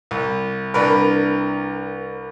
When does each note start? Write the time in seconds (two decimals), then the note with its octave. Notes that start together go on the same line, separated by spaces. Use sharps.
0.11 C2
0.74 C2 D4 A#4 B4